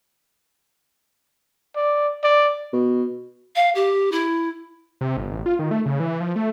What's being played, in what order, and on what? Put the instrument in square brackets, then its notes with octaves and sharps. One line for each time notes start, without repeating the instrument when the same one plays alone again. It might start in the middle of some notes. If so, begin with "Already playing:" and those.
[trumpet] D5
D5
[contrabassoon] B2
[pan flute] F5
G4
E4
[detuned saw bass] C3
G1
A1
F4
D#3
A3
C#3
E3
F3
A3